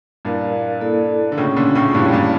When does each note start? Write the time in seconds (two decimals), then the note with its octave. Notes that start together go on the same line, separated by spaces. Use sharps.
0.25 G2 A#2 E4 A#4 D5 F5
0.81 A#3 E4 A4 D5
1.32 D3
1.37 A2 C#3 A#3 C#4 F4 C#5
1.56 A#2 D3
1.75 A2 C#3
1.94 G2 A#2 C#4 E4 G4 C#5 F5
2.06 A2
2.13 G2 A#2